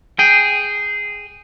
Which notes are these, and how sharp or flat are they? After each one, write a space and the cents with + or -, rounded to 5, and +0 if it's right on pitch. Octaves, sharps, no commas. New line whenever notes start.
G#4 -5 G5 +0